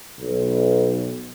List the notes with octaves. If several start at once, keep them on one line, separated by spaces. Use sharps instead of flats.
B1